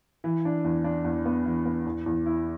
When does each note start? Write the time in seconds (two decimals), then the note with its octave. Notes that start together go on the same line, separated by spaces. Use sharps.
0.24 E3
0.45 D4
0.64 E2
0.84 D4
1.04 E2
1.25 B3
1.45 E3
1.66 B3
1.86 E2
2.06 E2
2.26 E4